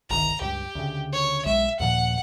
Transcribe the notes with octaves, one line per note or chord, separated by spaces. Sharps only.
G1 C2 D#3 A#5
C#2 G2 G4
D2 C#3
C#5
B1 G#3 E5
D#2 A#2 F3 F#5